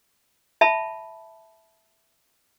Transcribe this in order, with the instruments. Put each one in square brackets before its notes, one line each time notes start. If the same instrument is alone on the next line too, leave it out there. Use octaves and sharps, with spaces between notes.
[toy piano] E5 A5 B5